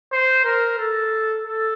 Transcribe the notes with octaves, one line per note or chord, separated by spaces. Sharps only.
C5
A#4
A4
A4